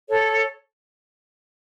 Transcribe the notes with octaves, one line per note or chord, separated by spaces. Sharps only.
A4 C#5